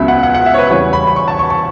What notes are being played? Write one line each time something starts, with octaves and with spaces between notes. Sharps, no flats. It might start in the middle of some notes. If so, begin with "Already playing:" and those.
Already playing: C#2 C#3 F#3 B3 E5
F#5
F#5
F#5
E5
C#5
B4
E2 C#3 E3 G3 C#5
B5
B5
C#6
A5
C#6
C#6